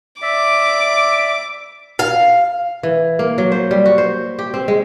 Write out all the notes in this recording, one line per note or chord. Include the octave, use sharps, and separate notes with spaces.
D5 E5 D6
F5
E3
A#3
F#3
C5
G3
F#4
C5
G4
C4
G#3